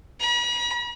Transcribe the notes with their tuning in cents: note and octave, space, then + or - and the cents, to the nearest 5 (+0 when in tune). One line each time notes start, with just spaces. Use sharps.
B5 -45